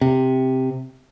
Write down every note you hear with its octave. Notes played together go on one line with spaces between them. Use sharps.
C3